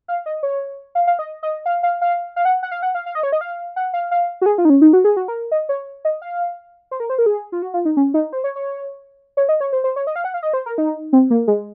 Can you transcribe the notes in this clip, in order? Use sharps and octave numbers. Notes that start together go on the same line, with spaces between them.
F5
D#5
C#5
F5
F5
D#5
D#5
F5
F5
F5
F5
F#5
F#5
F5
F#5
F5
F5
D#5
C#5
D#5
F5
F#5
F5
F5
F#4
G#4
F4
D#4
C#4
D#4
F#4
G#4
F#4
A#4
D#5
C#5
D#5
F5
C5
A#4
C5
A#4
G#4
F4
F#4
F4
D#4
C#4
D#4
C5
C#5
C#5
C#5
D#5
C#5
C5
C5
C#5
D#5
F5
F#5
F5
D#5
C5
A#4
D#4
C4
A#3
G#3